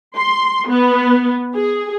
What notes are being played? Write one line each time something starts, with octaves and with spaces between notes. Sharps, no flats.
C6
B3
G#4